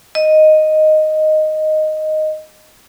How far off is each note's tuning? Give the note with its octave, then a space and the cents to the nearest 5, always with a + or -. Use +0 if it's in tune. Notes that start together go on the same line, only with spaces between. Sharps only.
D#5 -5